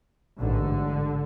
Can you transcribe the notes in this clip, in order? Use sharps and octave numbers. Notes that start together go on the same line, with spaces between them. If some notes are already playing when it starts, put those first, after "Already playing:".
A1 G#2 D3